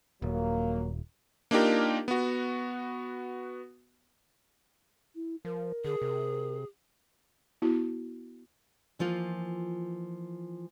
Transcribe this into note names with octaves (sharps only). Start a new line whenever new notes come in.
D#1 F#3 A#3
A#3 D4 D#4 F4 G4 A#4
B3 F#4
E4
F3 A#4
D3 G#4
C3
B3 E4 F#4
E3 F3 A#3 F4